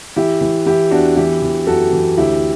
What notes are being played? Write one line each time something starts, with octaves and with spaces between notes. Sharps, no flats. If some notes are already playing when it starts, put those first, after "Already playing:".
E3 E4 G4
E3
E3 E4 G4
E2 D4 F#4
E3 E4 G4
E3
F#2 F#4 A4
E3
D2 E4 G4